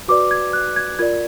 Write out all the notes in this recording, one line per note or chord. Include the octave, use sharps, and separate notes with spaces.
F#4 B4 D5 D6
G#6
F#6
G#6
F4 A#4 D5 G#6